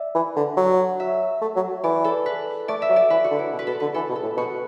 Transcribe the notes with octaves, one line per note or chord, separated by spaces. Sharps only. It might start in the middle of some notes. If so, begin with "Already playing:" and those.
Already playing: D5 E5
E3
D3
F#3
E5
A3
F#3
E3 D5
A4
B4
A3 D5
E5
F#3
D5
E3 B4
F#4
D3
E4
B2
B4
B2 A4
D3 B4
E3 A4
B2
A4
A2
B2 F#4